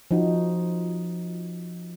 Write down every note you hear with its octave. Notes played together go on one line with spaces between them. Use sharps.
F3 D#4 F#4